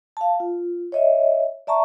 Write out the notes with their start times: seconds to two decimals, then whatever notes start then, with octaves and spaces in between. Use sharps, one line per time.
0.17 F5 A5
0.40 F4
0.92 C#5 D#5 E5
1.67 D5 E5 A5 A#5 C#6